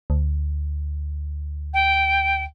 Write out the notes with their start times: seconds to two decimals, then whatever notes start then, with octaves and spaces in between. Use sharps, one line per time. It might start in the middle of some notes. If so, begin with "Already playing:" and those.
0.10 D2
1.73 G5